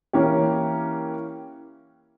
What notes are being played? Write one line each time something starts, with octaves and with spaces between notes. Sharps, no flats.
E3 A#3 C#4 G4